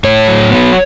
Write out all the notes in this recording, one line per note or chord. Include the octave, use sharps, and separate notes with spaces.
A2 C#5
F#3
B3